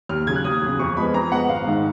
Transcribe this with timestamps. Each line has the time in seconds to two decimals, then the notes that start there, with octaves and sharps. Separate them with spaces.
0.09 D#2 F6
0.27 C#3 F#3 G#6
0.36 F#6
0.44 D#2 D#6
0.62 C#3 F#3
0.79 F2 C#6
0.96 F3 G#3 B3 B5
1.14 F2 A#5
1.32 F3 G#3 B3 F#5
1.49 G#1 F5
1.66 G#2 D#3